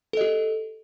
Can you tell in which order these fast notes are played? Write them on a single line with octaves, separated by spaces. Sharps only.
A4 D#5 G4